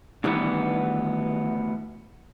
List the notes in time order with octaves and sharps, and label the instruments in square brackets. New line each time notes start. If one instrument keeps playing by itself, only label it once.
[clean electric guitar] D2 E3 B3 [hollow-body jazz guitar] D#3 G3 D4